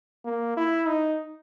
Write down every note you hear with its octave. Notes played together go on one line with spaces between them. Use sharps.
A#3
E4
D#4